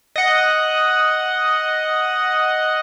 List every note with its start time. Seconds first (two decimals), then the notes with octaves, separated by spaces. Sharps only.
0.16 D#5 F#5